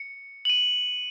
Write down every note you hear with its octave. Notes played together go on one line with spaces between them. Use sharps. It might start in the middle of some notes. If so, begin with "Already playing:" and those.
Already playing: C#7
F#7
D#7